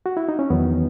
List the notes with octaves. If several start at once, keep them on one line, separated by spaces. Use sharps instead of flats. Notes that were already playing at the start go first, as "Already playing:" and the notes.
F#4
E4
D#4
C#4
E2 D#3 F#3 B3